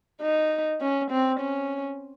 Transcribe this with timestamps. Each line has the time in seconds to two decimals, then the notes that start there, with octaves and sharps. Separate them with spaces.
0.22 D#4
0.81 C#4
1.11 C4
1.40 C#4